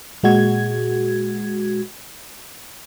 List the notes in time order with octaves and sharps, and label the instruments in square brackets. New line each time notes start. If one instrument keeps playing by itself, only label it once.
[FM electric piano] A#2 G#3 F#4 G#6